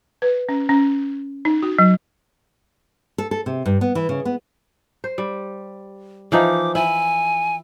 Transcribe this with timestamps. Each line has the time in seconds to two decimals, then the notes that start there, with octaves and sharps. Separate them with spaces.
0.22 B4
0.49 C#4
0.69 C#4
1.45 D#4
1.62 F#4
1.79 F#3
3.18 A4
3.31 A4
3.46 C3
3.66 G2
3.81 B3
3.95 E3
4.09 C#3
4.25 B3
5.04 C5
5.18 G3
6.32 E3 F3 D#4 D6
6.75 E4 G#5